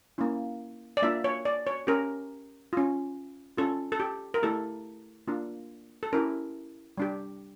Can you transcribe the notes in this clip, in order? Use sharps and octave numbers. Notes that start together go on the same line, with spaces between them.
A#3 C#4 E4
D5
A#3 D4 F4 E5
C#5
D5
C#5
C#4 G4 A#4
C#4 F4
C#4 F4 A4
A4
G4
A#4
A3 E4 G4 A4
A#3 D4 F4
A4
C#4 E4 G4 A#4
G3 D4 G4